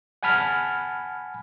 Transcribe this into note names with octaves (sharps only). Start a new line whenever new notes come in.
F#5 G#5 A5 B5 F6